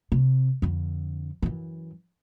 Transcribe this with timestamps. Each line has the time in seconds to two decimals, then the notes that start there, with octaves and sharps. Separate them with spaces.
0.12 C3
0.62 F2 D3
1.42 F#2 E3